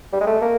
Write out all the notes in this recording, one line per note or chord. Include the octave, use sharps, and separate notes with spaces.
G3
G#3
A3
A#3